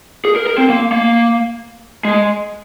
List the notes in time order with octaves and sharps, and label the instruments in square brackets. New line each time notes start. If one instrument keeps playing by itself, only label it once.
[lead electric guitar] G#4
A#4
A#4
C4
A#3
A#3
G#3